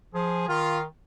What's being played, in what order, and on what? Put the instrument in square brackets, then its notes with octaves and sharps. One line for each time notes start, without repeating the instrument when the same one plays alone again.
[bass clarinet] F3 [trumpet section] G#4
[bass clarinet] D#3 [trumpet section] F4